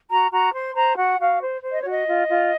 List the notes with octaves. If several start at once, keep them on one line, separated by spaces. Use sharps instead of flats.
F#4 A#5
F#4 A#5
C5 C6
C5 A#5
F#4 F#5
F#4 F5
C5
C5
D#5
F#4 C#5
D#5
F4
F4